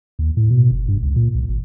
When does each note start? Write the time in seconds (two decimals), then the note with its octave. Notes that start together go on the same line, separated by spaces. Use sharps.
0.19 D#2
0.37 A2
0.50 B2
0.71 F#1
0.88 G2
1.02 C#2
1.16 A#2
1.35 C2
1.49 G#1